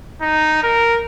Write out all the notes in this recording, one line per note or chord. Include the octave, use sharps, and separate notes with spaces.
D#4
A#4